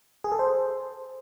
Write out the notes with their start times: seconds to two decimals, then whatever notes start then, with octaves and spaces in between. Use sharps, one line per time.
0.24 G#4
0.32 A4
0.39 C5